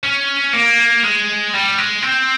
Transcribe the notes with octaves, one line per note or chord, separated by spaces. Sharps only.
C#4
A#3
G#3
G3
G#3
C4